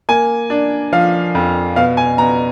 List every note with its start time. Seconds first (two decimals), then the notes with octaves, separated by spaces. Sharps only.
0.09 A#3 G#5
0.50 D4
0.92 F3 F5
1.35 F2
1.76 B2 F5
1.97 G#5
2.18 B2 A#5